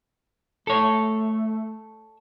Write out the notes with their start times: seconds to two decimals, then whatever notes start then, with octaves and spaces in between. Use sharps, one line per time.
0.67 A3 A4 C#5